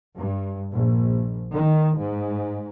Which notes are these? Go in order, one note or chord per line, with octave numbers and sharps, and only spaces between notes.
G2
A#1
D#3
G#2